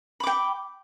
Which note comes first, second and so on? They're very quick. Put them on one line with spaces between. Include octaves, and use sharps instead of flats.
B5 D6 G5